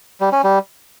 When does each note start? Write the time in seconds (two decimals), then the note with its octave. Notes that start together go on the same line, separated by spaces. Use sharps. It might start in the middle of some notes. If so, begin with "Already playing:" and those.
0.21 G3
0.32 C#4
0.44 G3